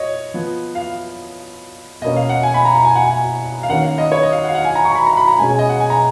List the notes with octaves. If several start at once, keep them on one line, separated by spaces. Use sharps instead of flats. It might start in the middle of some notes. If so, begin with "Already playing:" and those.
Already playing: C#5 D#5
F3 B3
F5
B2 A#3 C#4 D#5
F5
F#5
G#5
B5
A#5
A#5
G#5
F#5
G#5
F5
D#3 A#3 C#4 F#5
F5
D#5
C#5
D#5
F5
F#5
F5
F#5
G#5
A#5
C#6
A#5
B5
A#5
B5
A#5
B2 G#3 C#4 G#5
G#5
D#5
F#5
G#5
A#5